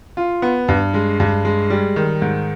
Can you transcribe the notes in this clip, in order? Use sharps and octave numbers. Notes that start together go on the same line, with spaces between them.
F4
B3
G2
G#3
G2
G#3
G3
D#3
G#2